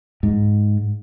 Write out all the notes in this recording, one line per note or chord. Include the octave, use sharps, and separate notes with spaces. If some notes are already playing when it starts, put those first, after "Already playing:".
G#2